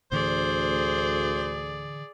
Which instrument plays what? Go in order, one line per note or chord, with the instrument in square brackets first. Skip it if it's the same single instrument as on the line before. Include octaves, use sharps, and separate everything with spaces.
[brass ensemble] D2 [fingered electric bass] A2 D3 E3 [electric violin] G#4 D5 [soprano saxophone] C5